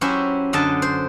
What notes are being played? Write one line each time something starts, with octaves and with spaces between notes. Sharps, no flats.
F#3 C#4 E4 G4 C5 E5
F#2 D3 D#5 A5
C5